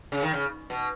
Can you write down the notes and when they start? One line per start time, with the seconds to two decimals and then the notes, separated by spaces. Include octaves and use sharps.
0.12 C#3
0.23 D#3
0.34 C#3
0.70 B2